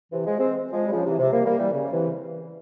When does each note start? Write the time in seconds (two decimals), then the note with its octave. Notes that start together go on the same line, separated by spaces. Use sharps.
0.12 C3 E3
0.26 F3 G#3
0.39 G#3 C4
0.73 F3 G#3
0.87 G3
0.92 C#3 F3
1.05 C3 E3
1.19 C3
1.33 G3 A#3
1.45 G3 A#3
1.59 E3 G3
1.72 C#3
1.92 C3 E3